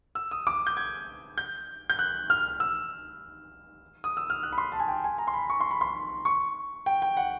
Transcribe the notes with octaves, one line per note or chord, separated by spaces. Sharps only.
E6
D#6
D6
G6
G#6
G6
G6
F#6
F6
E6
D#6
E6
F6
F#6
B5
C6
A5
G#5
G5
G#5
A#5
C6
B5
C#6
C6
B5
C6
C#6
G5
G5
F#5